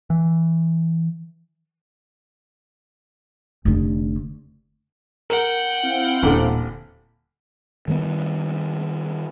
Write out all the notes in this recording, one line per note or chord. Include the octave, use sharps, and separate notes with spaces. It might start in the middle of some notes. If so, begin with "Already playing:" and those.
E3
F1 D3
A#4 F#5 G5
C4 E4 F5
D#1 A1 D3
D#3 G3 G#3 B3